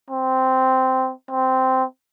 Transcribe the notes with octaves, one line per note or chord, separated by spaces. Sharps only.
C4
C4